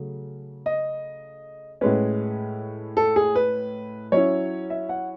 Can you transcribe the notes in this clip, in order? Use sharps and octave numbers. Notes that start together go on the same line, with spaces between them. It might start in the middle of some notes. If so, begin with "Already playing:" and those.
Already playing: C#3 F#3 A3
D#5
A2 G#3 C#4 B4
A4
G#4
B4
F#3 C#4 E4 C#5
E5
F#5